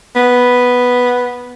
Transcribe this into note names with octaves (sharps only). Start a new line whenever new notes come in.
B3